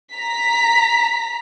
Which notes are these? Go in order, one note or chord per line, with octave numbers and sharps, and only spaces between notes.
A#5 B6